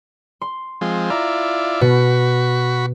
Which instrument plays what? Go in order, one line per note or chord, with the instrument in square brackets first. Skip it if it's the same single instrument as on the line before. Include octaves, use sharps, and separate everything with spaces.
[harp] C6
[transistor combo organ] F3 G#3 C4
[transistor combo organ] E4 F4 D5 [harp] A#5
[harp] B2 [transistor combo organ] F#4 B5 C#6